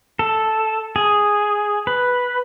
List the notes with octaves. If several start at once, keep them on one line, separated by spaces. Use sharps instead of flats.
A4
G#4
B4